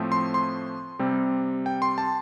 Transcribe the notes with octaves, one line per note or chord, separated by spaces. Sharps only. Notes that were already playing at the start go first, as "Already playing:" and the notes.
Already playing: A2 F3 A3 C4
C6
C6
C3 G3 C4
G5
C6
A5